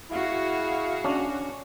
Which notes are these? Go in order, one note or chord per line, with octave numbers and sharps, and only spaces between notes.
E4 F#4 G#4 F5
C#4 D4